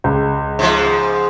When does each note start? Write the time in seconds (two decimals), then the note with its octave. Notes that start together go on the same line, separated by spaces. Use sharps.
0.04 C#2
0.59 G#2 F3